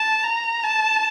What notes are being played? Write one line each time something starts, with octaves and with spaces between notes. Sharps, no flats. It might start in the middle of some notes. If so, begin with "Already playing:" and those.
Already playing: A5
A#5
A5